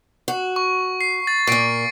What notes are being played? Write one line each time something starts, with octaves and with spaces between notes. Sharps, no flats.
F#4
C#6
C7
A6
A#2 A#3 C#6 C7 D7